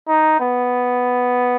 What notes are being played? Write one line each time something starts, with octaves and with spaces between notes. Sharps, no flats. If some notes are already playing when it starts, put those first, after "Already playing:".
D#4
B3